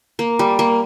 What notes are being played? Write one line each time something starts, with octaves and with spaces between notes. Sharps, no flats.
A#3
G3
A#3